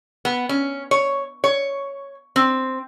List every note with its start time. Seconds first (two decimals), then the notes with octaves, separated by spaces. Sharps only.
0.25 B3
0.49 C#4
0.91 C#5
1.44 C#5
2.36 C4